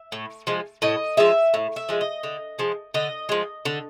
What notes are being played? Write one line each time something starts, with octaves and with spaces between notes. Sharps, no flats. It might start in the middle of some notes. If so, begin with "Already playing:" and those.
Already playing: E5
A2
F3 G#3
A2 D#5
F3 G#3 E5
A2
E5
F3 G#3
D#5
D3
F3 G#3
D3 D#5
F3 G#3
D3